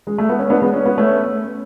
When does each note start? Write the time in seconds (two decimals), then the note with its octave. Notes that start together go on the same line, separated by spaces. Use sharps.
0.07 G#3
0.18 A3
0.29 B3
0.39 C#4
0.50 B3 D4
0.62 G#3 B3
0.74 C#4
0.86 B3
0.98 A3 C#4